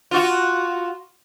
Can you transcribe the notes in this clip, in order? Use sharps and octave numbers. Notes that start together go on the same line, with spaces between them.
F4 F#4